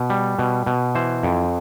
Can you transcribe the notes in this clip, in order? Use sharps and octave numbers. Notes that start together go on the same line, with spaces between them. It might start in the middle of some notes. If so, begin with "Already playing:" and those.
Already playing: B2
G3
B2
B2
E3 C5
F2